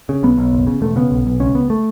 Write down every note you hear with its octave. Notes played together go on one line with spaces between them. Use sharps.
C#3
B1 B3
B1
F#1
C#3
E1 A3
C#3 B3
B1
B1
C#2 C#4
C#2 B3
A3